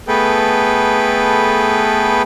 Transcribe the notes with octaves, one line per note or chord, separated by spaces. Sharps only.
A3 B3 G#4 A4 B4 G5